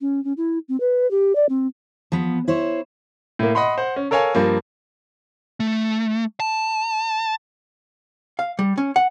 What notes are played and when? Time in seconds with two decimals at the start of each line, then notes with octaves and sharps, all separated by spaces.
0.01 C#4
0.24 C#4
0.37 E4
0.69 C4
0.80 B4
1.11 G4
1.36 D5
1.49 C4
2.12 F3 B3
2.48 E4 C5 C#5
3.39 A2 A#3
3.55 D#5 F#5 B5 C6
3.78 C5 F#5
3.96 C#4
4.11 A4 A#4 C#5 F5 G#5
4.35 G2 F3 A#3
5.60 A3
6.40 A5
8.39 F5
8.59 G3
8.78 C#4
8.96 F#5